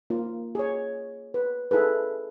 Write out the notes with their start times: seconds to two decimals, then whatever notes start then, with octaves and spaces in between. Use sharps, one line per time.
0.10 A#3 F4
0.55 G#4 C#5
1.34 B4
1.71 E4 G#4 A4 B4